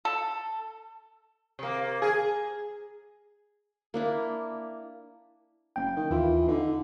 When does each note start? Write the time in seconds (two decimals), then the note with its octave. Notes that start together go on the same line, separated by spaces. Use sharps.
0.05 A4
1.59 C3 A#3
2.02 G#4
3.94 A#3 D4 E4
5.76 F#1 G5
5.96 D#3
6.11 D#2 E3 F4
6.48 D3 D#4